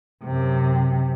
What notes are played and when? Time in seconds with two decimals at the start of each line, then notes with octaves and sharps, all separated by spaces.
0.23 F#2 C3